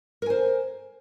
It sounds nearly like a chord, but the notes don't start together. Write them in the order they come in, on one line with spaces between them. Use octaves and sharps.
A#4 G#5 C5